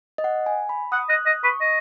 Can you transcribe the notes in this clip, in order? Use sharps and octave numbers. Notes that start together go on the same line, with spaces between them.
D#5
F#5
G#5
B5
F#5 D#6
D#5 F#6
D#5 D#6
B4 C#6
D#5